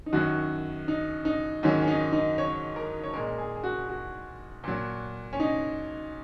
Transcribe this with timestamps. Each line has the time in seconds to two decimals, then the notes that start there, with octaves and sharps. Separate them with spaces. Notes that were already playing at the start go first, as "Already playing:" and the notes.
0.06 D#4
0.13 F#2 D#3 F#3 F#4
0.88 D#4
1.25 D#4
1.63 G#2 D#3 F#3 C#4
1.82 C#4
1.88 D#4
2.13 D#4
2.38 C#5
2.76 A#4
3.04 C#5
3.14 A#2 G#3 A#4
3.38 G#4
3.56 G#4
3.64 F#4
3.89 F#4
4.64 A#2 F#3
5.33 C#4
5.40 D#4